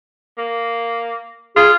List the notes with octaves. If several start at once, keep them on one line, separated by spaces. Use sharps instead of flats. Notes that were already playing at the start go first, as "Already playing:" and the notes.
A#3
F4 G#4